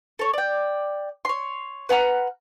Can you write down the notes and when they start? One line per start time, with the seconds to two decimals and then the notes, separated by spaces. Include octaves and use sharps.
0.19 A4 C#5
0.33 D5 G5
1.25 C#5 C6
1.89 B4 F#5 A#5 F6